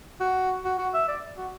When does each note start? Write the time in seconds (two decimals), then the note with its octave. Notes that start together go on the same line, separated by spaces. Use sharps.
0.21 F#4
0.65 F#4
0.79 F#4
0.94 E5
1.08 D5
1.37 F#4